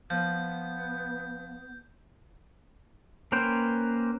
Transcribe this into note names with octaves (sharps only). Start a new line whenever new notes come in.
F3 B3 G6
A#3 C#4 B4 C5 G5